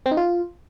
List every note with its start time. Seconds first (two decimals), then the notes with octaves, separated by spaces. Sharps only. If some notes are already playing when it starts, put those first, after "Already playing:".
0.06 C4
0.11 D#4
0.17 F4